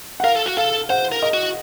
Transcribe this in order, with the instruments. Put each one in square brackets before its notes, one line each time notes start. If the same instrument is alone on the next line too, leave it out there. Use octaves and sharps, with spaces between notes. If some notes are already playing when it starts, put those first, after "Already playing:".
[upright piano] F#5
[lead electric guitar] A#4 [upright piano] F5
[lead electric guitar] A4
F#4
[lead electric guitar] A4 [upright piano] F5
[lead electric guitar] C5 [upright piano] F#5
[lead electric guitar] A#4
[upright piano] D#5
[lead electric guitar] F#4